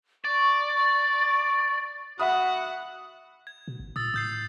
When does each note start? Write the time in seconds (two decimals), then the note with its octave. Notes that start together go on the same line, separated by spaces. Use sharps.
0.25 D5 C#6
2.19 F#4 E5 F#5 B5 D#6
3.47 G#6
3.68 B2
3.80 G#1
3.96 A#2 D#6 E6 A6
4.14 A2 D#6 G6 C7